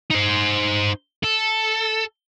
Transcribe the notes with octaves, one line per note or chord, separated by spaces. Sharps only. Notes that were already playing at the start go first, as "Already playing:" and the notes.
D#4 C5
A4